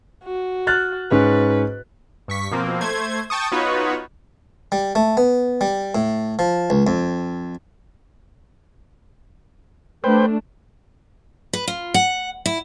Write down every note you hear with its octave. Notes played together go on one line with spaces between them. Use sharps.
F#4
F6 F#6 A6
G#2 C#4 B4
G2 C#6 B6
B2 F3 A#3 C4
A3 C5 G#6
G5 A5 C#6 D#6
B3 D#4 F4 F#4 B4 C#5
G3
A3
B3
G3
A2
F3
C#2
F2
A3 D4 B4 C5 G5
B4
F4
F#5
E4